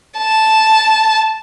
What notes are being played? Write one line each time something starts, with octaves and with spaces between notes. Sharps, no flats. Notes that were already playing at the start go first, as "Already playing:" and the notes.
A5